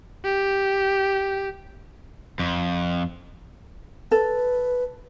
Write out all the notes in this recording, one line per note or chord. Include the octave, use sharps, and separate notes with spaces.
G4
F2
A4 B4